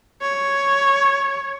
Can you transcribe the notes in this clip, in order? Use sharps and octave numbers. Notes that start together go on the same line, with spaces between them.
C#5